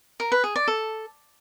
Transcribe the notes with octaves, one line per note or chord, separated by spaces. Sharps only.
A#4
B4
G#4
D5
A4